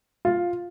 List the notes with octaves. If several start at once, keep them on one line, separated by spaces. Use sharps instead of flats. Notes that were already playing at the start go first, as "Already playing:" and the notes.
F4